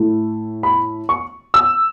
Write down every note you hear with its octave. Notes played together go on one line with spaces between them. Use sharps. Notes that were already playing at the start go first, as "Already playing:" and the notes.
Already playing: A2 A3 E4
B5
C#6
E6